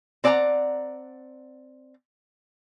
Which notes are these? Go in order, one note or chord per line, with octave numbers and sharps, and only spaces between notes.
C4 D5 F#5 A5 A#5